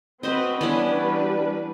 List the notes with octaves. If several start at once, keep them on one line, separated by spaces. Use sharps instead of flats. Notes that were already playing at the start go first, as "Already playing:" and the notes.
C4 F#4 B4 C5 D#5
E3 G3 B3 C#4 D4 B4